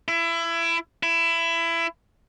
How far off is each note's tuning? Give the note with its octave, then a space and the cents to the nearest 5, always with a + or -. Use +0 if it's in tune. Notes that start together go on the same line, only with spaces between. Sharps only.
E4 +25
E4 +20